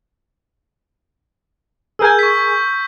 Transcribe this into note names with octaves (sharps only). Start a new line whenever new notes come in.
G#4 A#4 G#5 E6 G6
C#6 B6